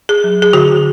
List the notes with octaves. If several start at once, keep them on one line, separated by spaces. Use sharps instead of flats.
G#4
F#3
G#4
D3 F#4